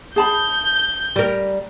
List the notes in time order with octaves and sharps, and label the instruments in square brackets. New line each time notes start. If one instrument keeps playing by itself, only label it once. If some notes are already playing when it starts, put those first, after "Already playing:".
[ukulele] G#4 A5 B5 [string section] G6
[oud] G3 A#4